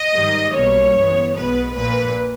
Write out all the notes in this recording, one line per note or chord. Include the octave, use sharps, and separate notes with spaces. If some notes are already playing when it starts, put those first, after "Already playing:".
Already playing: D#5
G#2 D#3 G3
B1 B2 G3 A#3 C#4 C#5
G1 G2 E3 G#3 B3
B1 B2 G#3 B3 B4
A#1 A#2 A#3 B4